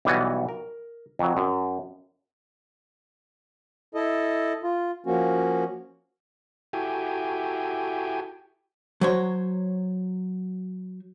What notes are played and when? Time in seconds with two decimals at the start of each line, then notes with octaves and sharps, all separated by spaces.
0.05 B1 E3 G3 B3 F#4 G#5
0.49 A#4
1.19 F2 F#3
1.37 F#2
3.95 E4 A4 D#5
4.63 F4
5.06 F3 A#3 C#4 F#4
6.73 E4 F#4 G4 A4 G5 G#5
9.01 F#3 C5 C#5